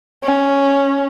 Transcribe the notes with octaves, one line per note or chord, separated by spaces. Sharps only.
C#4